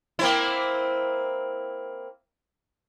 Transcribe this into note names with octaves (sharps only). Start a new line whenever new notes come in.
A#3 C4 E4